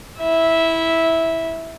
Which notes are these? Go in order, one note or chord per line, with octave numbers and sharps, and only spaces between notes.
E4 E5